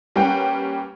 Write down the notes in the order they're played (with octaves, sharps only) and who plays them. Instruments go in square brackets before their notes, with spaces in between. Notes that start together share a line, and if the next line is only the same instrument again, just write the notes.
[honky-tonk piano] G3 A#3 C#4 B4 F#5 G5